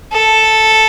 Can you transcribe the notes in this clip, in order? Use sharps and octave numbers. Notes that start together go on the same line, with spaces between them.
A4